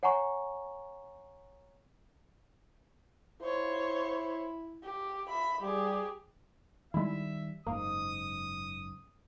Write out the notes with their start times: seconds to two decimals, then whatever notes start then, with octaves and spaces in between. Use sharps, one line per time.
0.03 C#5 F#5 G#5 A#5 C#6
3.42 E4 C5 C#5
4.83 G4
5.29 E5 B5
5.61 G3 G4 G#4
6.94 D#3 G3 G#3 E4 E5
7.67 F#1 G#2 A#3 D#6